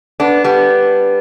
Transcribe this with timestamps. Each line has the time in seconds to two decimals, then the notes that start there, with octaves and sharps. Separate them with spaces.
0.20 B3 D4
0.44 G3 B3